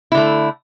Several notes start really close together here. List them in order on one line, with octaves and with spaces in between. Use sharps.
E4 D3 A3